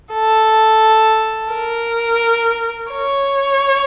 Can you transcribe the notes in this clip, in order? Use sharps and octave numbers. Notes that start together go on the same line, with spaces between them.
A4
A#4
C#5